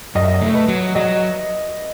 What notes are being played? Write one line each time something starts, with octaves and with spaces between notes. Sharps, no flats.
F#2 D#5
E5
D#5
A3
B4
F#3
F#3 D#5